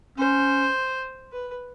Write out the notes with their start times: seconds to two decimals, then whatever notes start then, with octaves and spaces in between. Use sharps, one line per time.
0.18 C#4 C5
1.33 B4